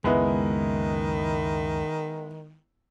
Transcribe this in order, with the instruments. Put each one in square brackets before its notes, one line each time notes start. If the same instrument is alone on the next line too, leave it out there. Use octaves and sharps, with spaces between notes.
[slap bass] C#2 F#2 [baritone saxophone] D#3 [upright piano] G#3 B3 E4